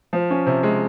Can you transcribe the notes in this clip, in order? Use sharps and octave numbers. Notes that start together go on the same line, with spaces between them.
F3
C#4
C3
G#3